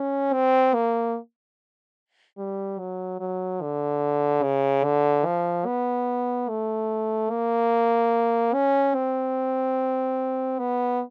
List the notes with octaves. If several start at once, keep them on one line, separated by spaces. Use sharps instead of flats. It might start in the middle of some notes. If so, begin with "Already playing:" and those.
Already playing: C#4
C4
A#3
G3
F#3
F#3
D3
C#3
D3
F3
B3
A3
A#3
C#4
C4
B3